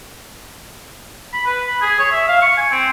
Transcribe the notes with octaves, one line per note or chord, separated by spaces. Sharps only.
B5
B4
B5
G#4
C#5
E5
F5
C#6
G#5
C4